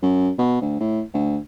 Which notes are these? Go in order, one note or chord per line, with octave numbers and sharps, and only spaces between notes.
F#2
B2
D2
A2
D2